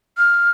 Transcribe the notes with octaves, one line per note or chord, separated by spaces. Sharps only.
F6